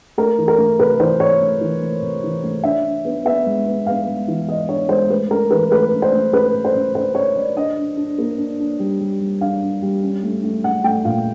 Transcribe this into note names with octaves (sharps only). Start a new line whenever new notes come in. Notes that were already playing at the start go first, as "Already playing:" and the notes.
A3 A#4
E3
A#4
A3
C3 B4
E3 C5
C3 C#5
A3
E3
A3
C3
E3
A3
D4 E5
D4
B3
B3 E5
G#3
B3
B3 F5
G#3
E3
B3 D#5
D4 C#5
G#3 C5
A3 B4
C#3 A#4
E3 B4
A3 B4
C#3
C5
A3
C#3 B4
C#3
C5
C#3
C#3 C5
C#3 C#5
C#3 D5
D4 D#5
D4
D4
A#3
D4
D4
G3
G3
G3
D4 F5
D4
G3
C#4
A3
A3
A3 F#5
A3 G5
A#2 F5